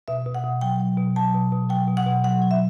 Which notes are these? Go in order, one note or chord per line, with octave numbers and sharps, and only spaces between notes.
B2 E5
B2
F#5
B2
F#3 G5
F#3
B2
F#3 A5
B2
B2
F#3 G5
B2
F#5
B2
F#3 F#5
F#3
E5